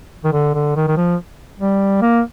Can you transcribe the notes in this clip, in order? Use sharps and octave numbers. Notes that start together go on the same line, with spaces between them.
D#3
D3
D3
D#3
D#3
F3
G3
A#3